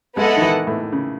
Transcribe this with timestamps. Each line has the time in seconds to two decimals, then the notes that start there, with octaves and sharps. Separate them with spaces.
0.17 G#3 B3 E4 A4 D#5 F#5
0.37 D#3
0.42 E3
0.67 A2
0.92 C#3